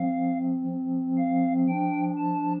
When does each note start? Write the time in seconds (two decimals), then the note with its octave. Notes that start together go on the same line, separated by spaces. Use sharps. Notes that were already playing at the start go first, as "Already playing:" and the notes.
Already playing: F3 C4 F5
0.67 F3 C4
1.17 F5
1.68 F3 D4 G5
2.18 A5